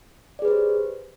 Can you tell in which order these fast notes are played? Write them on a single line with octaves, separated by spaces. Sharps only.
D5 G#4 B4 G4 C5